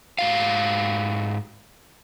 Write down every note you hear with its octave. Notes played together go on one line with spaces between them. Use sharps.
G#2 F#4 F5